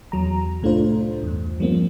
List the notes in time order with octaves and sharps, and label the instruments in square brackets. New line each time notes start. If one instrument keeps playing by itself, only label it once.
[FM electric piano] E2 F#3 A#5
C2 A2 A3 D4 F4 C5
E2 G2
F3 G3 A#3 C4